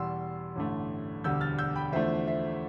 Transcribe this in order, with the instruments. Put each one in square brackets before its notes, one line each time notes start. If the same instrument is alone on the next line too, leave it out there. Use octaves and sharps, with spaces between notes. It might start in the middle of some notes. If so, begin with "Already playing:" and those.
Already playing: [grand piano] E2 B2 G3 C6 E6
A1 G2 D3 A3
E1 D2 D3 G3 E6 G6
F6 A6
E6 G6
G5 B5
E2 D3 F3 A3 C5 E5
C5 E5